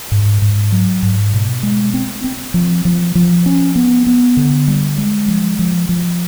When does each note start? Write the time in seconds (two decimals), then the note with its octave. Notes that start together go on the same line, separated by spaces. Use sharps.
0.12 G#2
0.42 G#2
0.72 F#3
1.03 G#2
1.33 B2
1.63 G#3
1.94 C4
2.24 C4
2.54 F3
2.85 F3
3.15 F3
3.46 C#4
3.76 B3
4.07 B3
4.37 D3
4.68 G3
4.98 G#3
5.28 F3
5.59 F3
5.89 F3